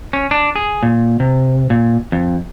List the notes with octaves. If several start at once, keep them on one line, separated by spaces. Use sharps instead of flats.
C#4
D4
G#4
A#2
C3
A#2
F2